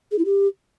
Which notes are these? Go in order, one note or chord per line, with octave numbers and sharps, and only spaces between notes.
G#4
E4
G4